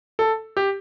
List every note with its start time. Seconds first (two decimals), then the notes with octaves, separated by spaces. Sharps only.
0.19 A4
0.57 G4